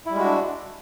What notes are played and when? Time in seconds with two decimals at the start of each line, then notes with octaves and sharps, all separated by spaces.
0.06 E4
0.11 G3
0.15 G#3
0.20 F#4
0.24 D4